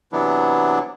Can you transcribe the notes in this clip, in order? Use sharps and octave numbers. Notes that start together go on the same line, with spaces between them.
C3 E3 F#3 B3 D4 E4